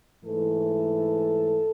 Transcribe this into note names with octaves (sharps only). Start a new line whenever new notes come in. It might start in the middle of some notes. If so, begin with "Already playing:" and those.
G#2 E3 A3 A4